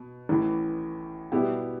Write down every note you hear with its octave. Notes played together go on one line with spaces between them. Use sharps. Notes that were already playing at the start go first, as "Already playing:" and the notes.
Already playing: B2
A1 A2 E3
B2 G3 B3 E4 G4